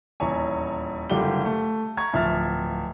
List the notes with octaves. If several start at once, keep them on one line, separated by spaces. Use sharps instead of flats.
D#1 E2 C#5 G#5
F#1 D3 G3 F4 G4 G7
A3
A#5 C#6 G#6
D1 F3 E5 F6 A6